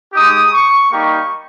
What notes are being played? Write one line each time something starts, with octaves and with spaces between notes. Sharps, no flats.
G#3 D#4 G4 D#6
C#6
G3 A#3 D#4 G4 C#6